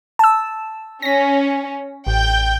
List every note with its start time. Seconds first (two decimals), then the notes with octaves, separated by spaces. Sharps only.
0.19 A5 E6
1.02 C#4 A#6 B6
2.07 A1 G5 G6